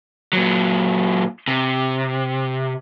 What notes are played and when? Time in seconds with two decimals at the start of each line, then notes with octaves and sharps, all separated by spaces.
0.33 A#2 F#3
1.48 C3